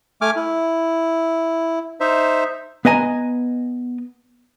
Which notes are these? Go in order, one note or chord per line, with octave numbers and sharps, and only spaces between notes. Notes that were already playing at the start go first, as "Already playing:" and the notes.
A3 G#5 D6 F6
E4
D#4 C5 E5
B3 B4 D#5 G#5 A#5